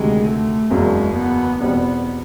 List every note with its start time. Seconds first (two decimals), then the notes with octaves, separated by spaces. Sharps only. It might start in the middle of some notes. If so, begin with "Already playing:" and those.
Already playing: D2 C3 D#3 G#3
0.25 A3
0.70 F#1 E2 C#3 F#3 G#3
1.15 B3
1.60 E2 B2 G3 B3 C4